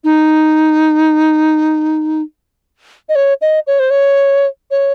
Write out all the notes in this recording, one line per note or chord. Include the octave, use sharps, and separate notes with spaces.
D#4
D#5
C#5
D#5
C#5
C5
C#5
C#5